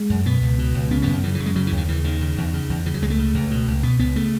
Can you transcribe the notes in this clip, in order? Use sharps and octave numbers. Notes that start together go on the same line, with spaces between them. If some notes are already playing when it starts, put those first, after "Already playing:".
Already playing: G#3
F#2
B2 B3
C#2
B2
C#2
C#3 B3
F#2 B3
D#3
C#3 E3
E3
F#2
G#3
C#3 F#3
E3
D#2
D#3
C#3 E3
D#2 D#3
C#3
E2
C#3
E2
C#3 E3
F#3
C#2 G#3
A3
C#3
C#2
B2
C#2
B2 B3
C#2 B3
C#3 A3